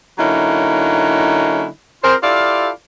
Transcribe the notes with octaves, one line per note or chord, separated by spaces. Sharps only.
D3 F#3 A#3 C#4 D#4 E4
C4 F4 G#4 A#4 C5
E4 F4 G4 A4 D5 F5